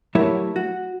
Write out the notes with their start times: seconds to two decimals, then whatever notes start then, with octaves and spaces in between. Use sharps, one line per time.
0.15 F#3 A3 E4 G4 A#4 C#5
0.56 F#4